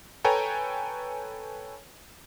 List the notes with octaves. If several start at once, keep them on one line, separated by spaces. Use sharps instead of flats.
A4 B4 C#5 G5 G#5 A#5